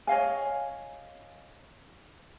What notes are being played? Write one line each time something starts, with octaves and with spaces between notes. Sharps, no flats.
C#5 D#5 F5 G#5